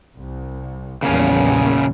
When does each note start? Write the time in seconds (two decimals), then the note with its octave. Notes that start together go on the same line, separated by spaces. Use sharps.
0.16 C2
1.03 A#1 E2 C#3 G3 A#3 C#4